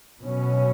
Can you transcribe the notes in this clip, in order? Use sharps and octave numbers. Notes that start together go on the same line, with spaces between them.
B2 F#3 C#4